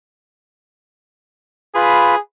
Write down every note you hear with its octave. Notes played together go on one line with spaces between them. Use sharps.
F4 G#4 B4 B5